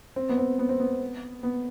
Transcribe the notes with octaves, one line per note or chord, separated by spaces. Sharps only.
C4
B3
C4
B3
C4
B3
B3